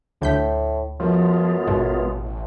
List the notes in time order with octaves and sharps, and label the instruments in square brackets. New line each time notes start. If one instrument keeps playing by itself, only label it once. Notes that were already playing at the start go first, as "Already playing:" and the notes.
[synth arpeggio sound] D2 G6 B6 [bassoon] A2
[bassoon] F#2 [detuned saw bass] F3 [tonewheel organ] G#3 B3 F4
[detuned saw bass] A1 [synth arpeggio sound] G#2 B2